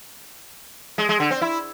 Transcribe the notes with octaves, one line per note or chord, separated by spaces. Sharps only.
G#3
G#3
D3
C4
E4